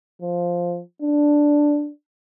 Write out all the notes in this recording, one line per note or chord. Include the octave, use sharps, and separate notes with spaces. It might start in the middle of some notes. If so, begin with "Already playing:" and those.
F3
D4